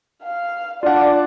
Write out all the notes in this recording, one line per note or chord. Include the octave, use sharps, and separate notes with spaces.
F5
D4 F4 D5 F#5